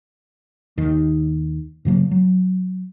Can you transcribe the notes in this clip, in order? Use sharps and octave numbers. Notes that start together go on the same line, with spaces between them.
D#2 D#3
G2 C#3 F#3 A#3
F#3